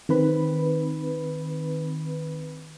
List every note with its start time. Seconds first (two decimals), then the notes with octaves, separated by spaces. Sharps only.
0.09 D#3 C4 B4 B5